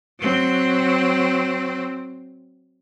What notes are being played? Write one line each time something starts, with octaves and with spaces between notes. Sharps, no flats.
F#3 C4